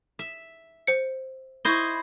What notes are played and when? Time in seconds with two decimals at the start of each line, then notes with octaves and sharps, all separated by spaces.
0.19 E5
0.87 C5 C#7
1.65 E4 C5 D#5 C#6 G7